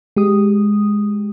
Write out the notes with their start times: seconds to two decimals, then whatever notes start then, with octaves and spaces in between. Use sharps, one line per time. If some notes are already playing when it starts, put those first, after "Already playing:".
0.16 G#3 G4 D#6